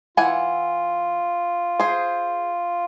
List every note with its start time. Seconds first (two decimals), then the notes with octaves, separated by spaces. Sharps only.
0.17 E3 F4 F#5 G#5
1.80 G#4 C5